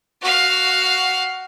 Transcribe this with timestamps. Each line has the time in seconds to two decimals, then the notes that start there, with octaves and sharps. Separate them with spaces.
0.21 F#4 F5